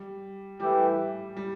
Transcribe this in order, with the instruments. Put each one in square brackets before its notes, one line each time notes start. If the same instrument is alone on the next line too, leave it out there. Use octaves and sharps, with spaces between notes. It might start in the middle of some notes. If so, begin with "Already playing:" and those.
Already playing: [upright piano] G3
[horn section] E3 A3 E4 G4 [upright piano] G3
[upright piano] G3